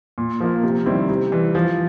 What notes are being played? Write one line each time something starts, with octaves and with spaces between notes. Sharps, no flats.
A#2
F3 A#3
C3
D#3 G3 C4 E4
C3
E3 G3
F3